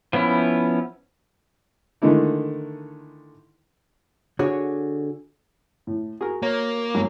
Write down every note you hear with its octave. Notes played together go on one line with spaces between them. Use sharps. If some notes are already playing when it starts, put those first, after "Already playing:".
F3 B3 C#4 E4
D3 D#3 G#3 A3 D#4 E4
D3 F#4 G#4 C#5
A2
F#4 G#4 A#4
A#3 C#5
G#2 F#3